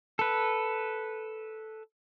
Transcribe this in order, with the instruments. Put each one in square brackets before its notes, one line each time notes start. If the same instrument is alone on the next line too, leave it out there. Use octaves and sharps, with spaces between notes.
[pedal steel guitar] A4 B4